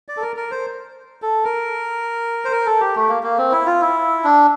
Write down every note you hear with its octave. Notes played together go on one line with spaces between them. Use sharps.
D5
A4
A#4
A#4
C5
A4
A#4
C5
A#4
A4
G4
A3
A#3
A#3
C4
E4
F4
E4
D4